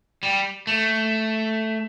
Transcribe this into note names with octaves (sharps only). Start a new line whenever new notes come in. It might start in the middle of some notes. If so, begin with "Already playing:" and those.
G3
A3